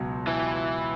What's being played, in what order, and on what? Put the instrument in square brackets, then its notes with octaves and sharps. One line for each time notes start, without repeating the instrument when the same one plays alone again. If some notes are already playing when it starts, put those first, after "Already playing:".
Already playing: [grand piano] C#2 B2 F#3
[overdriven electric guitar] E3